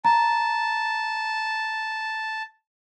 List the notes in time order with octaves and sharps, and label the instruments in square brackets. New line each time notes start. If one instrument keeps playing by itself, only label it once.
[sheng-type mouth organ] A5 [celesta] A#5